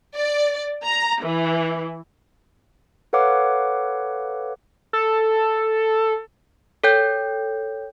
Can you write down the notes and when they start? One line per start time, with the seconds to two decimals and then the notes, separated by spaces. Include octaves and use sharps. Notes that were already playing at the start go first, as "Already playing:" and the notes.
0.15 D5
0.83 A#5
1.22 E3
3.13 A4 B4 C#5 F5 F#5 D6
4.93 A4
6.84 A4 C#5 G5 G6